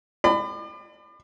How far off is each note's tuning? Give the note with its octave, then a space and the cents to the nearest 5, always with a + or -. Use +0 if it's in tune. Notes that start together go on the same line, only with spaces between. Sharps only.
D5 +40 B5 +30